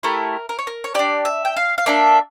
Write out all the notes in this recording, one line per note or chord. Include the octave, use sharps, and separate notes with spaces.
A3 E4 G4 A#4
A#4
C#5
A#4
C#5
D4 G4 D5
E5
G5
F5
F5
A#3 D4 A4 E5